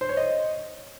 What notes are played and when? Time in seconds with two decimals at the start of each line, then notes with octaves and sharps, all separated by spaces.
0.01 C5
0.09 C#5
0.17 D#5